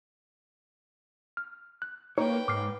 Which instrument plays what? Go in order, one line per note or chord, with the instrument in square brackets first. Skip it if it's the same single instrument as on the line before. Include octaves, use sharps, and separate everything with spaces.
[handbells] F6
F#6
[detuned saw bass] A#3 [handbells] D#4 [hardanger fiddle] B4 G5 [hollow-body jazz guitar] C#5
[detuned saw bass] G#2 [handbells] D6 F6 C7